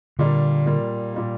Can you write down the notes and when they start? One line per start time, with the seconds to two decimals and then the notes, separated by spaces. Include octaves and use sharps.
0.19 A#2 D3 G3 A#3
0.66 A#2 G3 A#3
1.14 A#2 G3 A#3